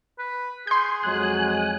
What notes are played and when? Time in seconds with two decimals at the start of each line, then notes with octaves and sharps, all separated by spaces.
0.19 B4
0.67 G#4 C6 G6
1.03 F2 F#3 G#3 G#5 F#6